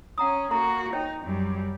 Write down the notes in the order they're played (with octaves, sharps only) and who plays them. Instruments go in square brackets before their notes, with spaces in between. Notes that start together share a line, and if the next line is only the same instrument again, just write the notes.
[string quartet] C#4 [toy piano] F#5 A#5 D#6
[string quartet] A#3 F#4 [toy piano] A4 A#5
[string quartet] D#4 [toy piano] C#5 G5
[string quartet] F#2 G3